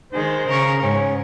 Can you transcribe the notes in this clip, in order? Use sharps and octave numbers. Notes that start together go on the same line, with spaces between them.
D#3 G#3 C5
C#3 A#4 C#6
G#2 C#4